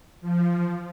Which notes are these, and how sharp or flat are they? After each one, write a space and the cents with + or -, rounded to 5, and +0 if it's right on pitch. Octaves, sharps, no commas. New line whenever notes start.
F3 -10